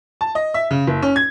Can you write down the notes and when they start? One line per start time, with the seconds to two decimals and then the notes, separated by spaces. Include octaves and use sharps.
0.21 A5
0.35 D#5
0.54 E5
0.71 C#3
0.87 F#1
1.02 C#4
1.16 G#6